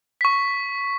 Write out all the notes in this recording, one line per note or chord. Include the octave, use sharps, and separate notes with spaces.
C#6 B6